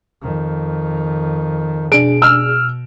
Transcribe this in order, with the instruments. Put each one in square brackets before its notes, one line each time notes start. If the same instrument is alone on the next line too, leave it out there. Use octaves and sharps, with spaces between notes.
[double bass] F2 D#3
[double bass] B2 [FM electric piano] D4 G#4 [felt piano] D7
[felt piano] E6 F6